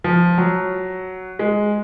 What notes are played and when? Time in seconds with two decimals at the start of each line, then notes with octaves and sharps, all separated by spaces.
0.04 F3
0.38 F#3
1.39 G#3